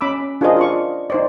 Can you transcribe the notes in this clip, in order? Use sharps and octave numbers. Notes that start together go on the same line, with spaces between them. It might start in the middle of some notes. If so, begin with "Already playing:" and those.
C#4 B5 D6 E6
D4 F4 G#4 A#4 C5 D#5
F4 D5 C#6
D#4 C5 D5